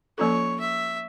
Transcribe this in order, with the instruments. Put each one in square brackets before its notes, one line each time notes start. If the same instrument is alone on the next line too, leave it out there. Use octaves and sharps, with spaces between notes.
[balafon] F3 A#3 C#4 F4 A4 [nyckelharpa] C#5
[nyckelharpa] E5